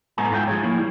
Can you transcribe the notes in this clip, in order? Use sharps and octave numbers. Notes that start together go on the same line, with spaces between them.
A2 G#3 A3 B3 G#5 A#5
G#2 F4 B4 G5
F3 G#4 C#5
A#3 E4
G3